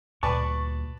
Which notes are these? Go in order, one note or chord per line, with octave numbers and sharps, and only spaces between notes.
D2 G2 A#2 B4 D5 A5 C#6